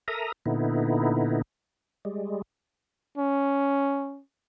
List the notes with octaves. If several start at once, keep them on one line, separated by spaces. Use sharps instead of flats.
A4 A#4 E5 A#5 D#6
A#2 D3 B3 D#4 E4
G3 G#3
C#4